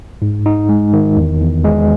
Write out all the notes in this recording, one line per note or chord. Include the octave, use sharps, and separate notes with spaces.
G#2
D#4
G#3
D#3
E2
E2
G#3